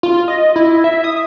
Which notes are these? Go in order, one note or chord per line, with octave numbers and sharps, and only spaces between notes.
F4
D#5
E4
E5
D#6